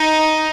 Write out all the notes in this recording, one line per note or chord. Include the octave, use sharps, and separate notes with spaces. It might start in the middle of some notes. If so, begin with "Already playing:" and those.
Already playing: D#4